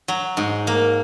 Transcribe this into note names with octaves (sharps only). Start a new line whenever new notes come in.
F#3
G#2
A#3